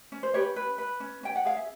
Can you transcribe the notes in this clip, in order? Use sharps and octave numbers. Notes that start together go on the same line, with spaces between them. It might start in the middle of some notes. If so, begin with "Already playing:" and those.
C#4
C5
G4 B4 C#5
B4
B4
C#4
C#4 G5
F#5
G#4 F5
E5